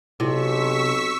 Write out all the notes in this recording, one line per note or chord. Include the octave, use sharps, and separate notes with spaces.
B1 C3 E4 C#6 E6 B6